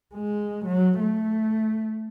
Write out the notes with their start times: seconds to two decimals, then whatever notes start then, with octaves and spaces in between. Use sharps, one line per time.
0.14 G#3
0.66 F#3
1.00 A3